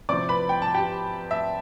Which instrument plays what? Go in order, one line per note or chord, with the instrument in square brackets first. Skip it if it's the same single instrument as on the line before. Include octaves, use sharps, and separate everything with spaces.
[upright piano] C3 F3 C4 E4 D5 D6
B4 B5
G5
A5
G4 G5
E5